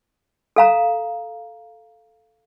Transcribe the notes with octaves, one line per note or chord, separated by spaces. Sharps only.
A4 F5 A#5